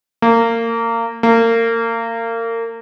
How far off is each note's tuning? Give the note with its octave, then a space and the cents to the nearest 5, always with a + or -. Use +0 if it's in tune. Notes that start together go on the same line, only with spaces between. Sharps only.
A#3 -25
A#3 -30